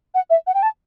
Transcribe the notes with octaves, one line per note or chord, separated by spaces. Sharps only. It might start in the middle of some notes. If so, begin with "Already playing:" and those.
F#5
E5
F#5
G5
A5